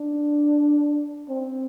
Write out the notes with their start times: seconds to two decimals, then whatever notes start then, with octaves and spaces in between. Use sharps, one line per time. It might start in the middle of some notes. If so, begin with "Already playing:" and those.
Already playing: D4
1.29 C4